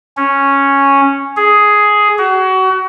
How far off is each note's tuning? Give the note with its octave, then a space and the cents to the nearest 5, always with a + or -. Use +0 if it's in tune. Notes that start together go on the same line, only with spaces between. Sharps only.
C#4 -5
G#4 +5
F#4 +30